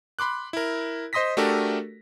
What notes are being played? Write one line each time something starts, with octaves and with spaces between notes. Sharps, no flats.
B5 C6 D6 F#6
E4 A#4
C5 D#5 C6 D#6 A#6 B6
A3 D4 F#4 G4 A4 A#4